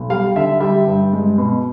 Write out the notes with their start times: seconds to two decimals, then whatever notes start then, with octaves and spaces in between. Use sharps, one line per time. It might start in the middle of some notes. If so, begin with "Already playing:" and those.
Already playing: B1
0.10 G3 F5
0.36 D3 E5
0.60 G3 E5
0.87 G2
1.13 G#3
1.38 B2